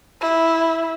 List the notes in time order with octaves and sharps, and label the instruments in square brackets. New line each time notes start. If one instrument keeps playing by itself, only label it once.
[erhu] E4